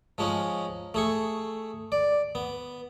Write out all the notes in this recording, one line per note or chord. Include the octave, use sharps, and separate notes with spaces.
F3 G#3 C#4 D#4
A3 G#4 C#6
D5
B3